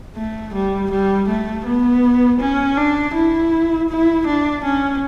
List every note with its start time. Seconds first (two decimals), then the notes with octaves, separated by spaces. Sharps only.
0.16 A3
0.53 G3
0.90 G3
1.28 A3
1.66 B3
2.40 C#4
2.77 D4
3.14 E4
3.89 E4
4.26 D4
4.64 C#4